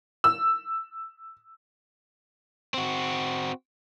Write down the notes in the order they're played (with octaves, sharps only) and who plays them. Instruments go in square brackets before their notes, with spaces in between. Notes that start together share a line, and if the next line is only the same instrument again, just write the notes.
[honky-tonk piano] E6
[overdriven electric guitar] C4 F#4